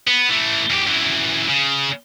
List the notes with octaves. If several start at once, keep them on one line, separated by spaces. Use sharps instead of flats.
B3
E3 A3
E2 G4
F#2 E3
C#3